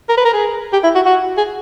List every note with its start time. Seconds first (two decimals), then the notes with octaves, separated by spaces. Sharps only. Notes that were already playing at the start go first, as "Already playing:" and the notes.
0.09 A#4
0.17 B4
0.25 A#4
0.33 G#4
0.73 G4
0.84 E4
0.95 F#4
1.06 F#4
1.38 G#4